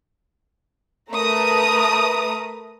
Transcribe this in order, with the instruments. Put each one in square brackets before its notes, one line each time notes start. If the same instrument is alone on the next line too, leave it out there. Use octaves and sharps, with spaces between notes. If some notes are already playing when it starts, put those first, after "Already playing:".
[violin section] A3 A#4 B4 A#5 D#6